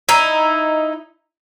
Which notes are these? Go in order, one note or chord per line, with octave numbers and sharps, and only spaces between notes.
D#4 E4